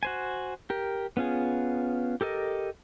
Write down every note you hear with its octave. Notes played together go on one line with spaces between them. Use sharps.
F#4 C5 G#5
G4 A#4
B3 C#4 F4 G#4
G4 A4 A#4 D#5